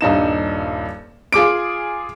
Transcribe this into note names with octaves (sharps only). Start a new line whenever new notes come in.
D#1 G2 D#4 E7
F4 G#4 D6 D7